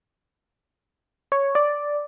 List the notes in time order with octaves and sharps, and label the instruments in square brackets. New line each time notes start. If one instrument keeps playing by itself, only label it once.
[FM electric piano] C#5
D5